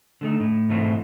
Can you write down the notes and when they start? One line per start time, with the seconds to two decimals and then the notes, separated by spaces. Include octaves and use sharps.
0.21 D3 A3 D#4
0.40 A2
0.69 G#2 B2 E3 A3 C4 E4